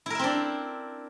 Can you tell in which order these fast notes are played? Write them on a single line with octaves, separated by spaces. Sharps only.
E4 A#4 E5 C4 D4